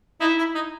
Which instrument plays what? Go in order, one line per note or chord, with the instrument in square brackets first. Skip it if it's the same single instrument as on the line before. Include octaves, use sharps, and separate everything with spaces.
[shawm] D#4 [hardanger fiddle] E4
[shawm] E4
D#4